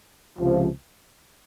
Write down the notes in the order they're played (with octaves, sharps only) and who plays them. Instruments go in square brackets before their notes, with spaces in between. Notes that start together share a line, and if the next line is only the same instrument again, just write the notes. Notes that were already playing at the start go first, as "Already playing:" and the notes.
[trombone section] C#2 C3 F3